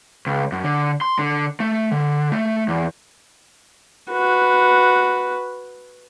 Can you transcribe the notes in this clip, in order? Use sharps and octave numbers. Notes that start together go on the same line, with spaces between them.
C#2
F#2
D3
C6
D3
A3
D3
A3
E2
F#4 B4